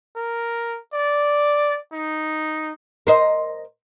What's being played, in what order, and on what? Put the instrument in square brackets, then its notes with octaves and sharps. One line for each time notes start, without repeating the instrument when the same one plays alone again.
[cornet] A#4
D5
D#4
[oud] A#4 C5 D#5